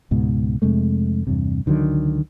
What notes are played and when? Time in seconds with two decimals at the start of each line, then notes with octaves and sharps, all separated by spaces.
0.11 C#2 G#2 B2
0.62 F2 C3 G#3 A3
1.27 E2 G2 C3
1.66 C#2 D3 D#3 F#3